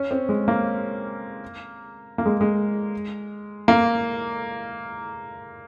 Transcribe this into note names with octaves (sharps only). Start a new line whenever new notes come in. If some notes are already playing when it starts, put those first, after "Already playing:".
Already playing: C#4
C4
G#3
A#3
A#3
G#3
G#3
A#3